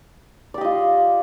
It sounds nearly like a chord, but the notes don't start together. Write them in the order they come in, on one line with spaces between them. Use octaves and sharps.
D5 G4 D#5 F4